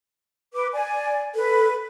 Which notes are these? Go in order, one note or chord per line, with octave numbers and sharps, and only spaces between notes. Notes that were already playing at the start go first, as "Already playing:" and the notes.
B4 D6
D5 G#5
A4 B4